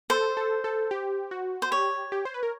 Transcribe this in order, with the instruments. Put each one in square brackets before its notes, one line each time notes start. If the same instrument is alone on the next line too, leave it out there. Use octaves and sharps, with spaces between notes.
[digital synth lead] A4 [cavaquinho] C5
[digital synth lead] A4
A4
G4
F#4
[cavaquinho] C5
[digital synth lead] G4 [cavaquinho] C#5
[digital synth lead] G4
C5
B4
A#4